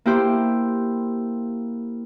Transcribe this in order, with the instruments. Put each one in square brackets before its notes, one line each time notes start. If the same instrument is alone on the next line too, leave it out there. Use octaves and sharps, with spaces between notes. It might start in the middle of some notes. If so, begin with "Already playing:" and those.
[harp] A#3 E4 G4 C5